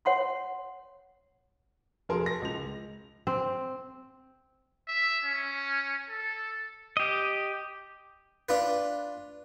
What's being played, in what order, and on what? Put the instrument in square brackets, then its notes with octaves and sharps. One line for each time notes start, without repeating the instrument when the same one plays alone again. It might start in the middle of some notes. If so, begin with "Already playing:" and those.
[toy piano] C#5 F#5 C6 C#6
[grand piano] F1 F#3 G#4 A#4 A5 C6
A#6
C#2 F7
[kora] C4
[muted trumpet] E5
C#4
A4
[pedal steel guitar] G4 D#5
[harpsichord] D4 F4 B4